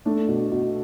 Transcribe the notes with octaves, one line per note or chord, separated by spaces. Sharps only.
A3 D4
B2
B2